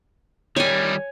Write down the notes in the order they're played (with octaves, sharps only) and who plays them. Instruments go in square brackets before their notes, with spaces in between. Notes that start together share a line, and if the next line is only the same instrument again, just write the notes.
[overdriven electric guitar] D#3 G3 [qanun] C#5 G#5